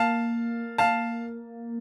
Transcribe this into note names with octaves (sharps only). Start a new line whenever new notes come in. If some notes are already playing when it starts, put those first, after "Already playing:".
Already playing: A#3 F5 A5
F5 A5